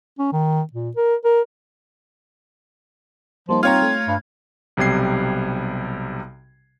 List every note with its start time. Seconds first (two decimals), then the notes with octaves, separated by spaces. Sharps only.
0.19 C#4
0.33 D#3
0.73 A#2
0.96 A#4
1.25 A#4
3.49 F3 G3 A#3 D#4
3.63 C4 F4 C#5 A#5 G#6
3.82 A3
4.08 G2
4.77 B1 C3 G3 G#6 C7